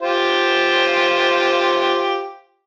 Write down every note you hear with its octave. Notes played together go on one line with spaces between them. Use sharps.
F4 G4 C5